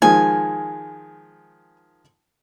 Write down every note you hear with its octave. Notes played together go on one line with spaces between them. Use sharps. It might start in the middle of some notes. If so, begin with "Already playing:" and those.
D#3 F3 G#3 G#5